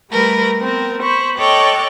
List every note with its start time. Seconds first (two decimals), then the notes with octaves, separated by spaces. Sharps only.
0.11 G3 A3 A#4 B4
0.59 B3 C4 A#4
1.02 C5 B5 C#6
1.39 A4 C#5 D#5 G5 D6 F#6